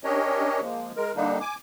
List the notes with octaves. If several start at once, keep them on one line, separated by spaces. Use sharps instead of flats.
C#4 D4 G4 A#4 C#5 D#5
F3 G#3 A#3
G#3 A#4
D3 G3 A#3 D4 D#4
G#5 D6